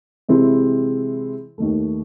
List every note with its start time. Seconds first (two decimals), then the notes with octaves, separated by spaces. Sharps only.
0.29 C3 E3 G#3 C4 E4
1.58 D#2 D#3 A3